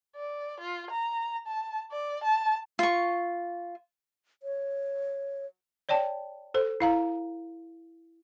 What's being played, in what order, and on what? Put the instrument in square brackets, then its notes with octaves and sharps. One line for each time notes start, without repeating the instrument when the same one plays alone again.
[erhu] D5
F4
A#5
A5
D5
A5
[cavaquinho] F4 C#6
[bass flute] C#5
[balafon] C#5 D5 G5 A5
A4 C5
E4 F5 A#5